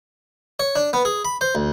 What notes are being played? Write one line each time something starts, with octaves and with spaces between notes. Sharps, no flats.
C#5
D4
B3
G#4
B5
C5
D2